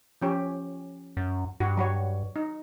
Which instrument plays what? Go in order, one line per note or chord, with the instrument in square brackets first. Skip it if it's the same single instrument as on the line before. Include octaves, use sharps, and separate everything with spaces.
[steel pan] F3 C#4 G4
[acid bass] F#2
[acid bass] G2 [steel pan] F#4
[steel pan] F#3 F#4 C#5
D#4